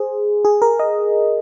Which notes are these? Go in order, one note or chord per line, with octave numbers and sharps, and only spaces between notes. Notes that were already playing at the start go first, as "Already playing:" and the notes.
Already playing: G#4 C5
G#4
A#4
D#5